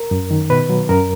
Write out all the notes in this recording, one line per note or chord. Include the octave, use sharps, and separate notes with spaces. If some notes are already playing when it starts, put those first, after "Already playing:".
Already playing: A#4
F#2
D#3
B2 B4
F#3
F#2 A#4